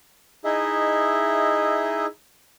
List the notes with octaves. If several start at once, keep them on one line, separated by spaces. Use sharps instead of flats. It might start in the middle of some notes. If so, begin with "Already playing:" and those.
D#4 E4 G#4 D#5 E5